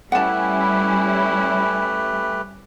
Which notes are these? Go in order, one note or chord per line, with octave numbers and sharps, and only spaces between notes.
G3 A3 C#4 E4 G4 B4 F#5 A5